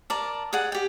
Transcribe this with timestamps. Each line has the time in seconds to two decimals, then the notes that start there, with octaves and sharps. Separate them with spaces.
0.10 A#4 D5 A5
0.53 G#4 D5 F#5
0.72 G4 G5